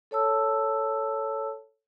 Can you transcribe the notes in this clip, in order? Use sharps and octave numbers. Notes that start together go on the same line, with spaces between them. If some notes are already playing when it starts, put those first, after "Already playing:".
A4 C#5 A5 E6